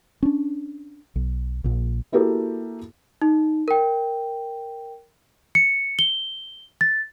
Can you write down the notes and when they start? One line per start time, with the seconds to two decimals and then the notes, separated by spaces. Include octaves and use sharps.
0.23 C#4 D4
1.16 B1
1.64 A#1 A#2
2.12 A#3 E4 F#4 G4 A4 A#4
3.22 D#4
3.68 A#4 G5
5.55 C#7
5.99 G7
6.81 A6